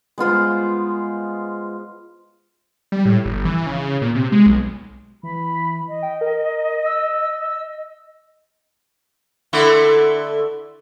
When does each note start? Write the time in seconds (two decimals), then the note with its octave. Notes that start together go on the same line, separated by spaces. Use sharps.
0.18 G#3 B3 F4 C5
2.92 G3
3.06 A2
3.26 G1
3.45 E3
3.67 C#3
4.02 A#2
4.15 C3
4.32 G#3
4.46 B1
5.23 E3 B5
5.88 D#5
6.02 G5
6.21 A#4
6.86 E6
9.53 D3 A3 E4